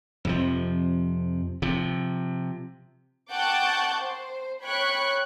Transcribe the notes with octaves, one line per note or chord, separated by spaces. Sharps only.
F2 C3 F3
C3 F3
F#5 G5 A5 C#6 D6 G6
C5
C#5 G5 B5 C#6 F#6